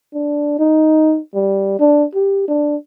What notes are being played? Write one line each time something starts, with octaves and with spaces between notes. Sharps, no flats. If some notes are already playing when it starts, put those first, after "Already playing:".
D4
D#4
G3
D4
G4
D4